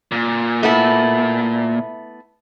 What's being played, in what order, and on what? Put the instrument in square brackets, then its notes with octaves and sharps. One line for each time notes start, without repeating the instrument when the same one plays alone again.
[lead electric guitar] A#2
[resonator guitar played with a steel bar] A3 B3 E4